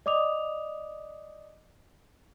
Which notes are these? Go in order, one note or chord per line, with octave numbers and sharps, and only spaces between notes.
D5 D#5 D6 D#6 F7